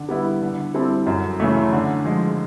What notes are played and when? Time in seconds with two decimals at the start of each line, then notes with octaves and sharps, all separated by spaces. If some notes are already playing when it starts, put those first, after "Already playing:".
Already playing: D3
0.09 G3 B3 E4
0.42 D3
0.74 G3 C4 E4 A4
1.07 F#2
1.40 C#3 E3 A3
1.73 D3
2.05 F3 G#3